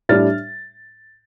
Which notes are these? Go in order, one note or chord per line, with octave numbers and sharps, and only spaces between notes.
A2 G3 D4 F6 A6